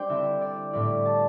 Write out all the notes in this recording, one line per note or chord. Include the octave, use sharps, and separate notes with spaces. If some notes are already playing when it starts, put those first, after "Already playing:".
Already playing: G3 D4 C5 D5 G5
D3 C4 E4 E5
D5
A2 G3 C4 E4 D5
A5